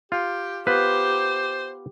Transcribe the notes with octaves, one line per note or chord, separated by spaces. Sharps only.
F4 G4
B3 F4 G4 B4 C5